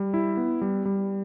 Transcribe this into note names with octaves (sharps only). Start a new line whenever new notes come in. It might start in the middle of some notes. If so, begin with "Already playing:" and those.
Already playing: G3
E4
B3
G3
G3